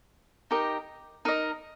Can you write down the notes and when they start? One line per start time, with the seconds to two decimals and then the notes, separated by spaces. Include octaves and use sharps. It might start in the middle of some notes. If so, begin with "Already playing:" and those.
0.51 D#4 G4 A#4 D#5
1.25 D#4 A#4 D#5